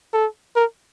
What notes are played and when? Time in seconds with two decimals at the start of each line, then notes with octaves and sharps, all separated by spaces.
0.13 A4
0.56 A#4